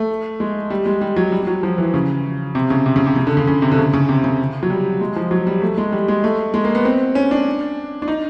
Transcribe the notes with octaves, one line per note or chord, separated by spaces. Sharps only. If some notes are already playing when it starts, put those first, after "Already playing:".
Already playing: A3
G#3
G3
G#3
G3
F#3
G3
G3
F#3
F3
E3
C#3
C3
C#3
C3
C#3
C3
C#3
D3
C#3
C#3
C3
D3
C#3
C#3
C3
C#3
F#3
G3
G#3
F3
F#3
G3
A3
G#3
G3
G#3
A3
G#3
A#3
B3
C4
C#4
D4
D4
D#4